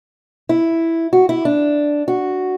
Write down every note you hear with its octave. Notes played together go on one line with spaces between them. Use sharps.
E4
F#4
E4
D4
F#4